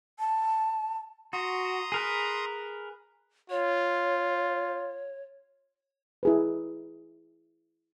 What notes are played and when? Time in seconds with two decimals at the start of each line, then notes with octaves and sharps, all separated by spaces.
0.19 A5
1.33 F#4 A#5 C6 D#6
1.92 G#4 A#4 B4
3.50 F4 C#5
6.23 E4 G#4 B4